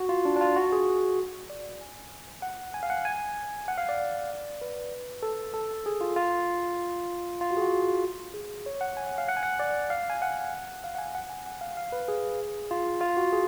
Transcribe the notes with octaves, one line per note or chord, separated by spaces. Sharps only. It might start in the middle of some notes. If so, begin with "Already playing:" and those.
Already playing: F#4
F4
D4
D4
F4
F#4
G#4
D5
G#5
F#5
G#5
F5
F#5
G#5
F#5
F5
D5
B4
A4
A4
G#4
F4
F4
F4
F#4
G#4
F#4
G#4
C#5
F#5
G#5
F#5
F5
F#5
G#5
F#5
D5
F5
G#5
F#5
F5
F#5
G#5
F#5
G#5
F#5
F5
F5
B4
G#4
F4
F4
F#4
G#4